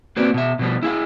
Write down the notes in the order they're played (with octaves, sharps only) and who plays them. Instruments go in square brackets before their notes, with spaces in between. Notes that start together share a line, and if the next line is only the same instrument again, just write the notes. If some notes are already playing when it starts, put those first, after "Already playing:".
[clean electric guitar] A#3 C4 F#4 B4 D5
B2 E5
B2 F3 G3
E4 G#4 E5 F5